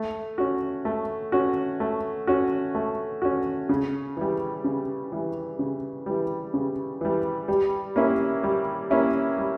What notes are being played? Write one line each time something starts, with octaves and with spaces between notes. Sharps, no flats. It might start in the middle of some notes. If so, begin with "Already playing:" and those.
Already playing: A3
C#4 F#4
A3
C#4 F#4
A3
C#4 F#4
A3
C#4 F#4
C#3
E3 G3
C#3
E3 G3
C#3
E3 G3
C#3
E3 G3
G3
A#3 C#4 E4
G3
A#3 C#4 E4
G3